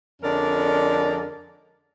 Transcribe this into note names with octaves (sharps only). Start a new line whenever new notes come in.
F2 D3 G#3 C#4 A#4 D5